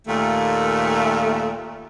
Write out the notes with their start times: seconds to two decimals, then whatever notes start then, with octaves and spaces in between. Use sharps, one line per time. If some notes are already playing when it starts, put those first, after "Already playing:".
0.08 D#2 A#2 A3